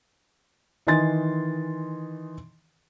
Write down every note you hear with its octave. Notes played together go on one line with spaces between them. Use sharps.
D#3 E3 D#5 G#5 C6 A6